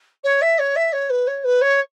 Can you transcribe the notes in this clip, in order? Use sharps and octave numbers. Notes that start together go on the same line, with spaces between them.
C#5
E5
C#5
E5
C#5
B4
C#5
B4
C#5